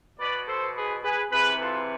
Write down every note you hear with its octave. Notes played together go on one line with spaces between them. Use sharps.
B2 B4 D5
A4 C5
G#4 B4
G#4 B4
C3 E3 G#4 B4
F4 A4